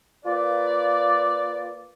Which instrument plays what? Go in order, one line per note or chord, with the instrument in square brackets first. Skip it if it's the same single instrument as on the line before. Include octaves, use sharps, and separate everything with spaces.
[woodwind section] A#3 F4 B4 D5